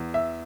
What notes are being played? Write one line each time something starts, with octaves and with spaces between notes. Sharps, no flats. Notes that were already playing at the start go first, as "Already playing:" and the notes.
Already playing: E2
E5